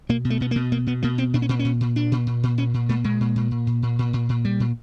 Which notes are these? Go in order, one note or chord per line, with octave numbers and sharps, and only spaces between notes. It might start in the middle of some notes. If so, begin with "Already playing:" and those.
B2 A#3
B2
A3
B2 B3
A#3
B2
B2 A#3
B2 B3
B2 A#3
B2 C4
A#2 D4
C#4
A#2 C4
C#4
A#2
A#2
A#2 D4
A#2
A#2
A#2
A#2 C#4
A#2
A#2 A3
A#2 G#3
A#2
A#2
A#2
A#2
A#2
A#2
A#2
A#2
A#2 G3
A#2